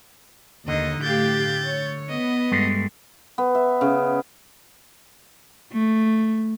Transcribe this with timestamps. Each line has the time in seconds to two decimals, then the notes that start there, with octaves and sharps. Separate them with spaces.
0.68 D#2 D3 D#4 D#5
1.02 A2 G4 F5 G6 A6
1.65 C#5
2.09 B3 D#5
2.52 G2 G#3 A3
3.38 B3
3.55 E5
3.81 C#3
5.73 A3